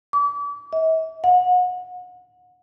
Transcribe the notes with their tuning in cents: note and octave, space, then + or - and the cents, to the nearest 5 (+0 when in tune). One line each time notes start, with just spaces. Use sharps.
D6 -40
E5 -45
F#5 -35